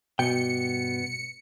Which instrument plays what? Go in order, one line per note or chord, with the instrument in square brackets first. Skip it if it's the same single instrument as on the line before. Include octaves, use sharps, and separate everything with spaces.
[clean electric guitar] G2 B3 G5 [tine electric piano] B2 [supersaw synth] C#7